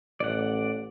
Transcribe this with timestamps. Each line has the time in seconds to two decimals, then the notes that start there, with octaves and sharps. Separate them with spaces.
0.20 A1 D5 F#5